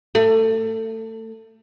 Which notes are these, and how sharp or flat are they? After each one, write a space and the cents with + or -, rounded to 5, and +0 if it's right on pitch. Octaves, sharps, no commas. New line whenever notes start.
A3 +25